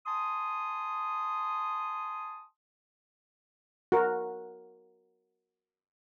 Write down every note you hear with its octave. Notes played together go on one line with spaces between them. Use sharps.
G#5 A5 C6 D#6
F#4 A#4